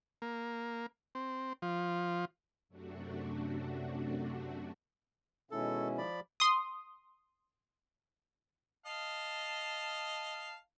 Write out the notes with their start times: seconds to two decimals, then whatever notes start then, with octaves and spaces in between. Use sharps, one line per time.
0.22 A#3
1.15 C4
1.62 F3
2.69 F#2 C3 A3 D4 F#4
5.51 B2 D#3 G#3 C#4 E4 A4
5.98 F3 D5 B5
6.40 C6 D#6
8.86 D#5 F5 A5